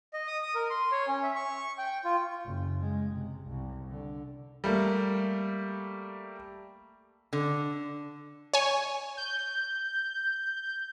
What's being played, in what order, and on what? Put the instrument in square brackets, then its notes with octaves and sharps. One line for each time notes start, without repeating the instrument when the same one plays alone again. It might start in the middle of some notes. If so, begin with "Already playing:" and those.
[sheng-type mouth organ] D#5
D#6
D#6
A#4
C6
C#5
C#4
E5
C#6
G5
F4
[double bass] F#1
G#3
C3
C2
D3
[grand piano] G3 A3 A#3
[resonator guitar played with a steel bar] D3
[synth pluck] C#5 G#5
[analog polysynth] G6